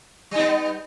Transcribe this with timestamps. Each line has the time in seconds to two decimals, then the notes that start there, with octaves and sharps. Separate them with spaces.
0.31 G3
0.35 D#4
0.39 B3